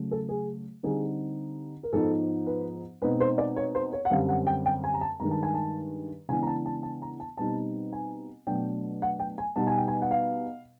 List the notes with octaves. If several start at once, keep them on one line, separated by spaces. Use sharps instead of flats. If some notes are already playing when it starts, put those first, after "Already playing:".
Already playing: C#3 F#3 A3
A4
G#4
D3 G3 C4 D#4 G#4
A#4
G#2 F3 G#3 B3 D#4 A4
B4
B2 G#3 C4 D#4 B4
C5
D5
C#5
C5
C#5
F#5
F#2 D3 G3 C4 F5
F#5
G5
G5
G#5
A#5
A5
G2 D#3 G#3 A#5
A5
G#5
A5
C#3 E3 G#3 B3 D4 G#5
A#5
A5
A5
A5
A#5
A5
B2 G3 C4 D#4 A5
G#5
B2 F#3 A3 D4 G5
F#5
G5
G#5
B2 G3 B3 D#4 A5
G#5
G5
G#5
F#5
F5